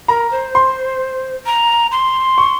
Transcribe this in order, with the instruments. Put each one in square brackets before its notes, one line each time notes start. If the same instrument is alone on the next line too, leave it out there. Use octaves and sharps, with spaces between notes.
[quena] A#4 [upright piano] A#5
[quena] C5
[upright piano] C6
[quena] A#5
C6
[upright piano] C#6